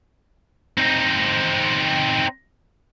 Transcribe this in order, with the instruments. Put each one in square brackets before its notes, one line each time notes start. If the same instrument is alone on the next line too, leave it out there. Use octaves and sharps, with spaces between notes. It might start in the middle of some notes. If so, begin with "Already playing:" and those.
[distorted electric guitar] C4 D#4